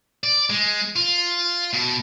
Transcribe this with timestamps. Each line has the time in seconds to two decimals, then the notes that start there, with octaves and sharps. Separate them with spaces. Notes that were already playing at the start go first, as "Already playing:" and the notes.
0.23 D5
0.50 G#3
0.96 F4
1.73 B2